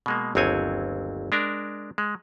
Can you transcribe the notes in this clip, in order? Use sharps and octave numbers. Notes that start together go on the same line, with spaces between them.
B2 G#3 A#3
G1 D#2 F#3 C4 C#5 G#5
G#3 D4 A#4
G#3